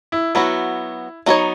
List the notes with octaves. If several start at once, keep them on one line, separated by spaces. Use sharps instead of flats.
E4
F#3 B3 E4 F#4
F#3 B3 D#4 F#4 C#5